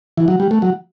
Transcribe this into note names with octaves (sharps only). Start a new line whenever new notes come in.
E3
F#3
G3
A3
F#3